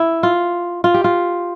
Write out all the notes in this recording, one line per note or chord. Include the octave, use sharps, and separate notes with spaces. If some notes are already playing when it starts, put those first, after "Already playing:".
Already playing: E4
F4
F4
G4
F4